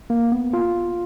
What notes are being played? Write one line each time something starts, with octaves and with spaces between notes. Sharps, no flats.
A#3
B3
F4